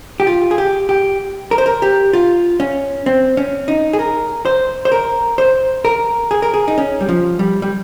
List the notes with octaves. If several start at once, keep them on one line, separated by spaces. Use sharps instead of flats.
G4
F4
G#4
G4
G4
A#4
C5
A#4
G4
F4
C#4
C4
C#4
D#4
G#4
A#4
C5
C5
A#4
C5
A#4
G#4
A#4
G#4
D#4
C#4
G3
F3
G3
G3